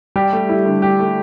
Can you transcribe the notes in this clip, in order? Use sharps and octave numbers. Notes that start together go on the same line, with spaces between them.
G3 G4
A3
E4
D3
G4
A3